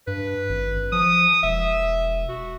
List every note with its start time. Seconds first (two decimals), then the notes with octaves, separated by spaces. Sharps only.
0.07 G2 B4
0.49 G#1
0.92 F3 D#6
1.43 E1 E5
2.29 F#4